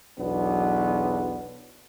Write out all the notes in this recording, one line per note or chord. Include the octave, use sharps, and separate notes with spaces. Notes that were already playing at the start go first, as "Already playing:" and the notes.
B1 E2 F#3 B3 D4